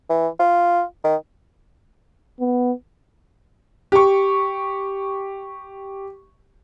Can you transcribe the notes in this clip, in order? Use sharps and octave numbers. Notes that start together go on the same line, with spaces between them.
E3
F4
D#3
B3
G4 C#6